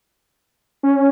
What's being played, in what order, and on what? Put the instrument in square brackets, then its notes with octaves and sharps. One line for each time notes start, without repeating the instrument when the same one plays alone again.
[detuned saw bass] C#4